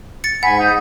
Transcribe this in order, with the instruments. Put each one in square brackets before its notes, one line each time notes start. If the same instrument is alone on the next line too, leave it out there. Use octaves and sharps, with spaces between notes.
[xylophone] A6 C#7
[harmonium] G#2 [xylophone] F#5 [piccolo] G#5 [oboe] B5
[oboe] D#4 [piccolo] G6